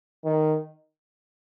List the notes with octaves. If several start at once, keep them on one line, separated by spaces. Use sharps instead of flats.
D#3